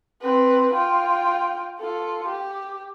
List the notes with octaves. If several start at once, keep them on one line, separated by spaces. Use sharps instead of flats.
C4 B4
F4 G5
F4 A4
G4